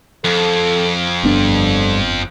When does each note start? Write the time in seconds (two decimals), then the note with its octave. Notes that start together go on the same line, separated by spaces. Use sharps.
0.24 F2 A4
1.24 G1 G2 D3 B3 D4